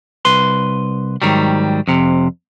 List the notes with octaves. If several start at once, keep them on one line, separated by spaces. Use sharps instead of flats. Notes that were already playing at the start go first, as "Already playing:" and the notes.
C2 B4 C6
G#2 D#3 F#3 G3
F2 C3